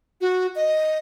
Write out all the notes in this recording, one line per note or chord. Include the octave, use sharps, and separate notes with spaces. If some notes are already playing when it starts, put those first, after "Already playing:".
F#4
D#5